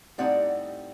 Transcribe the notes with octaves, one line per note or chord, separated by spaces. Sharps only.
A2 G3 C4 D#4 D5 F#5